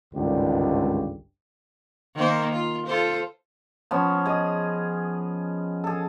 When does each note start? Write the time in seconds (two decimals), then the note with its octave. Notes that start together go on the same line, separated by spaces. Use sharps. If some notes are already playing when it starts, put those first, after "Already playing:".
0.14 G#1 C#2 G2 D3 G4
2.15 D#3 A#3 C5
2.53 F4
2.86 F4 A4 C5
3.91 F3 B3 C#4
4.26 G#4 D#5
5.84 G#4 A4